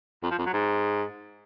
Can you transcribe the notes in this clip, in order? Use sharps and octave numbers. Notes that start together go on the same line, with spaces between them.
F2
F3
F2
F#3
G#2